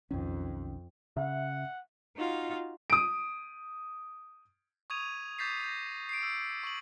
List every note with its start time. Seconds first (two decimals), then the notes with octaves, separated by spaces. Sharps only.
0.11 B1 F2 D#3 C#4
1.17 C#3 E5 F#5
2.16 D#4 F4 F#4 F5
2.90 D#6 D7
4.90 C#6 D#6 G#6 D#7 F7
5.39 C#6 D6 G6 A6 B6 C7
5.64 G6 A#6
6.09 C7 D7
6.23 E6
6.63 C#6 F#7